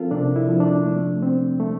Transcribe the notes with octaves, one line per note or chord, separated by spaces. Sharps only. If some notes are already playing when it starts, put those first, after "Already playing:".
Already playing: F3 C4 F4 A4 A#4
C3 D4
E4
F3
D4
A3
C4
A3